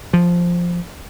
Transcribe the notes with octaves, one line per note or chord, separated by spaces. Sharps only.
F3